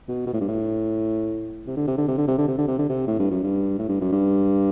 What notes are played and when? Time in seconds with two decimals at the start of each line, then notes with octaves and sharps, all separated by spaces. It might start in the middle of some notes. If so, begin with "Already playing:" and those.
0.08 B2
0.27 B2
0.34 A2
0.41 G2
0.48 A2
1.67 C3
1.76 D3
1.88 C3
1.98 D3
2.08 C3
2.18 D3
2.28 C3
2.38 D3
2.48 C3
2.58 D3
2.68 C3
2.79 D3
2.89 C3
3.07 A2
3.19 G2
3.31 F#2
3.44 G2
3.78 A2
3.89 G2
4.01 F#2
4.13 G2